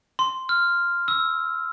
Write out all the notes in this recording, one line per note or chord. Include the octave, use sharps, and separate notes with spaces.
C6
F6
E6